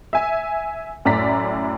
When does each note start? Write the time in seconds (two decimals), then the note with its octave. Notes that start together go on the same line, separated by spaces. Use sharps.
0.13 E5 G#5
1.05 F#2 A2 D5 A#5 B6